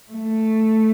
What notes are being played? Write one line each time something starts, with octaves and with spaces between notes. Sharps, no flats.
A3